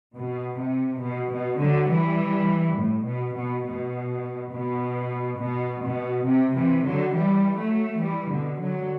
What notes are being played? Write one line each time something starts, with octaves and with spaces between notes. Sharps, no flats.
B2
C3
B2
B2
D3 F#3
E3 G3
A2
B2
B2
B2
B2
B2
B2
C3
C3 E3
D3 F#3
E3 G3
F#3 A3
E3 G3
B2 D3
D3 F#3